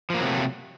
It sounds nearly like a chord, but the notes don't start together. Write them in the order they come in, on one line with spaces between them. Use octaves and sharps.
F3 A#3 F#3 C3 A3